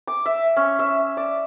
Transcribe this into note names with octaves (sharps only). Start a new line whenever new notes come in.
D6
E5
C#4
E5
D5